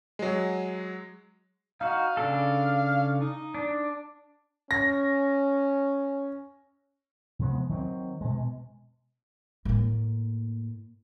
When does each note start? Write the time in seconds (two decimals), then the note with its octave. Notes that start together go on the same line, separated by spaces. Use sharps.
0.19 F#3 G#3
1.81 D#4 F#4 F5
2.17 C#3 D4 A4
3.21 D#4
3.54 D4
4.71 C#4 A#6
7.39 C3 F3 G#3 B3
7.69 D#3 F#3 B3 C4
8.21 B2 G#3
9.65 A2 A#3